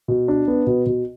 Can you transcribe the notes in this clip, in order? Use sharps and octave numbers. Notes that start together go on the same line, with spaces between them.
B2
D4
B3
B2
B2